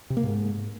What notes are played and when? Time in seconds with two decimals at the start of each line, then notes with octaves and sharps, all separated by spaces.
0.10 C3
0.17 A#3
0.23 G#2